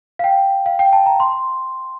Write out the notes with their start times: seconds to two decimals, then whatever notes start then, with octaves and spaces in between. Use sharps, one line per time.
0.19 F5
0.24 G5
0.66 F5
0.79 G5
0.93 A5
1.06 A#5
1.20 C6